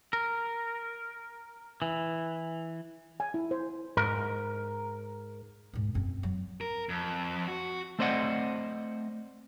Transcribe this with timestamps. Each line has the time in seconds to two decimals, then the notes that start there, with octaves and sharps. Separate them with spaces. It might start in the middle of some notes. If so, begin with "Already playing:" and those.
0.13 A#4
1.82 E3
3.20 G#5
3.34 E4
3.51 C5
3.97 G#2 A#4
5.73 D2 G#2
5.94 F#2 C4
6.23 F#3
6.61 A#4
6.89 F2
7.48 F#4
7.99 A3 C4 C5 D5 D#5 F#5